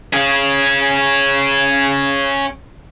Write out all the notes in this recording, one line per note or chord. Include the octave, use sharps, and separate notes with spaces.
C#4 G#4